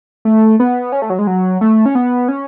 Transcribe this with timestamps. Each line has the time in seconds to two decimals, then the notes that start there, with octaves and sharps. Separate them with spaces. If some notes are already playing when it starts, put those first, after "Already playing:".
0.25 A3
0.60 B3
0.92 C#4
1.02 A3
1.10 F#3
1.19 G#3
1.27 F#3
1.61 A3
1.86 C#4
1.95 B3
2.28 C#4